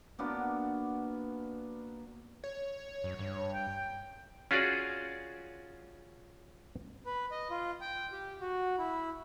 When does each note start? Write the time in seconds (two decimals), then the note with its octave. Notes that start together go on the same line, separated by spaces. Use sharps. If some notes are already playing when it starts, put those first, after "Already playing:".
0.19 A#3 B3 D4 F#4
2.44 C#5
3.04 F#2
3.19 G2
3.54 G5
4.51 C#4 F4 F#4 G#4 D5
7.05 B4
7.31 D#5
7.50 F4
7.81 G5
8.12 G4
8.41 F#4
8.78 E4